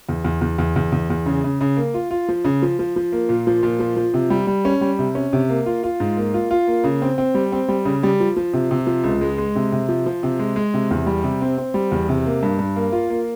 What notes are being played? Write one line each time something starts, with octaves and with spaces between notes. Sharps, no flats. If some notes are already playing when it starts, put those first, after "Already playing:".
E2
E2
E2
E2
E2
E2
E2
C#3
C#3
C#3
A#3
F4
F4
F3
C#3
F3
F3
F3
A#3
A#2
F3
A#2
F3
F3
C3
G3
G3
C#4
G3
C3
C#4
C3
A#3
F4
F4
G#2
A#3
F4
F4
A#3
C#3
C4
C4
G3
C4
G3
C#3
G3
F3
F3
C3
C3
F3
C#2
G#3
G#3
C3
C3
F3
F3
C3
G#3
G#3
C3
E2
G3
C3
C4
C4
G3
E2
C3
A#3
G2
G2
A#3
F4
A#3